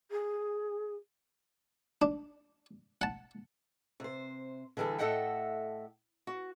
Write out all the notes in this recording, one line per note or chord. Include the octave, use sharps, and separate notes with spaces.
G#4
D4
F#5 A5
C3 C5
D3 E3 G3 G#4 A4
A2 A4 D#5 E5 F#5 G5
F#4